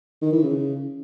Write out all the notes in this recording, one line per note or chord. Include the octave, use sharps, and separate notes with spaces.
D#3
E3
C#3